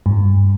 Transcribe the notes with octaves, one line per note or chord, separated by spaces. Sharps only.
G2